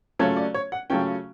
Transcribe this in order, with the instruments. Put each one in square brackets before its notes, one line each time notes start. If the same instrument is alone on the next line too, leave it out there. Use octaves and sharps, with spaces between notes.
[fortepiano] C#3 F#3 A3 C#4 F4 [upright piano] C#5
[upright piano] D5
C#5
F#5
[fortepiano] C#3 F#3 A3 C#4 F4 [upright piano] G5